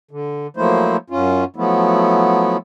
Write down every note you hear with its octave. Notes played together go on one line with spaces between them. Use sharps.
D3
F3 F#3 A3 A#3 E4 C5
F#2 C#4 F4
F3 F#3 A3 B3 E4